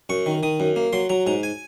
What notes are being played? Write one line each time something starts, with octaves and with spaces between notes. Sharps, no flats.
F#2 C#6
D#3
D#3 D#6
F#2
A#3
F#3 C6
F#3 A#5
G#2 A#5
G#5